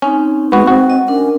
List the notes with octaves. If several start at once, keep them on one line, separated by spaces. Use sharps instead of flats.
C4 C#4 D#4
G#3 B3 F#4
C4 F#4
D#5
C#4 D4 A#4